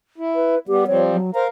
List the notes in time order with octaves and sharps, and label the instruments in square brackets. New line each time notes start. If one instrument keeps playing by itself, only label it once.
[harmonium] E4
[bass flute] B4
[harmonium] G3 B3 [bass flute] G4
[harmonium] F3 G3 C4 [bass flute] C#5
[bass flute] F#3
[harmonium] A#4 F5 A#5 [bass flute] C5